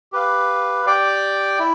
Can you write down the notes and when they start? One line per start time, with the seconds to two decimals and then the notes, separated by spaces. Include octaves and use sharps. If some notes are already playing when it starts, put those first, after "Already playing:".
0.12 G4 B4 F5
0.86 G4 D5 G5
1.59 E4